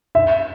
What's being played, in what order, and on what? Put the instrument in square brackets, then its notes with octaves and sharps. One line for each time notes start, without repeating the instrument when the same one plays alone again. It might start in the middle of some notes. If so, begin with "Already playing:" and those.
[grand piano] E5